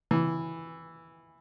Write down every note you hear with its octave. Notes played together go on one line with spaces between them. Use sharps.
E3